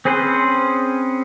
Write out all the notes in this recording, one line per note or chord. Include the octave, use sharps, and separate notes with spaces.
C4 C#4 G#4 B4 C5